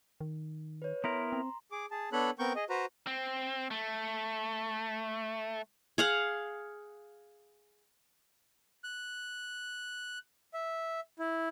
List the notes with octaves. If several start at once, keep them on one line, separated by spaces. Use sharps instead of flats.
D#3
B4 C#5
B3 E4 A#4 A#5 C6
C4
G#4 D6
G#4 A5
B3 D4 A4 C#5 B5 F#6
B3 C4 A#4 C#6 G6
G#4 D#5
F#4 B4 C5 A#5
C4
A3
G#4 F5 F#5
F#6
E5
E4